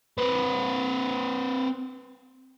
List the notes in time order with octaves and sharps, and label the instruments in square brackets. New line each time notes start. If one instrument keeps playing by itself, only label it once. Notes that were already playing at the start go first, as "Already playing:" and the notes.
[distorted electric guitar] C4 B4